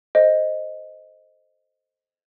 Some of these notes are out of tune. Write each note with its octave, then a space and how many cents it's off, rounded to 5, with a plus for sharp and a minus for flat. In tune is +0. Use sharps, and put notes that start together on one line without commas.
A4 +15 C5 +0 D#5 +0